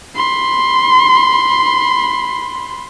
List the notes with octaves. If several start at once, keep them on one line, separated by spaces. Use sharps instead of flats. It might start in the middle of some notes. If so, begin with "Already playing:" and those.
B5 C6